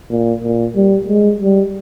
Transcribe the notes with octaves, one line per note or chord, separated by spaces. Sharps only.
A#2
A#2
G3
G#3
G3